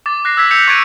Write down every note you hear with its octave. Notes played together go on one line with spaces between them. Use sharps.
D6 A6
F#6 A#6 C7
E6 G#6 B6
E6 G6 C#7 F7
C#6 F#6 G#6 A6 D7 D#7